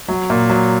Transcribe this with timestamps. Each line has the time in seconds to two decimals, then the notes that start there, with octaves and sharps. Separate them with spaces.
0.08 F#3
0.30 A#2
0.50 F#3